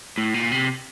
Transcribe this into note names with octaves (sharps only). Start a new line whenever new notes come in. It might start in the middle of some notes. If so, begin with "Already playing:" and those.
A2
A#2
C3